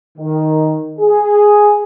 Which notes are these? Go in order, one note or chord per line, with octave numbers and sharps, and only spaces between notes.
D#3
G#4